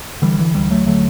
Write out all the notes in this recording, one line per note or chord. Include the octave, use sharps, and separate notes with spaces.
D3 E3 G3
E3
D2 E3 G3
F#3 A3
D3 F#3 A3